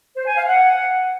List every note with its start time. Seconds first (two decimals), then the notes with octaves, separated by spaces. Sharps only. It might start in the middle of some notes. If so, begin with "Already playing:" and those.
0.16 C5
0.26 G#5
0.37 F5
0.48 F#5